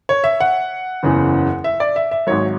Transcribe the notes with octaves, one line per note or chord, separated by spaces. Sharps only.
C#5
E5
F#5
F#1 E2 C#3 E3
E5
D5
E5
E5
G#1 G#2 F#3 C#5